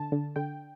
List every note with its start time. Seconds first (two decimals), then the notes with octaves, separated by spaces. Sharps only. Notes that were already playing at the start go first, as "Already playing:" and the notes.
Already playing: D3 A5
0.12 D3
0.36 D3 G5